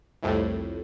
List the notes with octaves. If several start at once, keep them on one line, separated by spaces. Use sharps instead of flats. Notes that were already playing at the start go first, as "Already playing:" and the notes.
C2 F2 A2